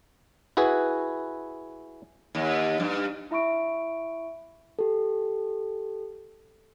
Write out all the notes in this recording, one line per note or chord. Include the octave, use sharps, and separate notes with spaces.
E4 F#4 G#4 B4
D#2
G2
E4 E5 B5 C#6 D7
G4 A4